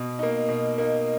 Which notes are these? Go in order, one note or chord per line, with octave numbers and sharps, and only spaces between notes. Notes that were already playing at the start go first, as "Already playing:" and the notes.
Already playing: B2
A#3 D#4
B2
A#3 D#4